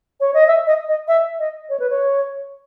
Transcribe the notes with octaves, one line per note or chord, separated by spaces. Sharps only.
C#5
D#5
E5
D#5
D#5
E5
D#5
C#5
B4
C#5